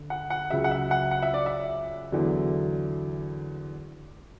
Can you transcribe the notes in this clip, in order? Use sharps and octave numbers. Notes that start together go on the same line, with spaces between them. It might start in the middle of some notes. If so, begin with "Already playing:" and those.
Already playing: D3
F#5
F#5
C#2 C#3 F#3 E5
F#5
E5
F#5
F#5
E5
D5
E5
E2 D3 F#3